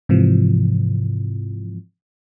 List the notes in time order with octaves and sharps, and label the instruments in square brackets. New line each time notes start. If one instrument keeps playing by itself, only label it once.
[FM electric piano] G#2 C3 E3 F3